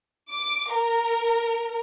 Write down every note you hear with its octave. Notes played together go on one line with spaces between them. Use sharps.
D6
A#4